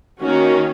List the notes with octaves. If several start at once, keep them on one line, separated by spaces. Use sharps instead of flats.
D#3 A#3 C#4 F#4